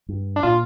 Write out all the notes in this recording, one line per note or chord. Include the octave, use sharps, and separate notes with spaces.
G2
D4
A#2 F4